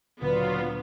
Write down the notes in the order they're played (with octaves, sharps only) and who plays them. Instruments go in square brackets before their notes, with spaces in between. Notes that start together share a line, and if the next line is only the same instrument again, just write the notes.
[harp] D2 A#2 [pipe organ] F#3 F4 [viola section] B3